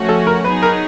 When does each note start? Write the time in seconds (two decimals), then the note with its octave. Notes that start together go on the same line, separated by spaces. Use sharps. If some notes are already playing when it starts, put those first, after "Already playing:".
Already playing: F3 A3 C#4 F#4
0.09 A4
0.27 A#4
0.44 F#3 B3 D#4 G#4 B4
0.62 A#4